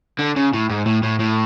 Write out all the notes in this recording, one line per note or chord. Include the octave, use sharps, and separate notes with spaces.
D3
C#3
A2
G#2
A2
A2
A2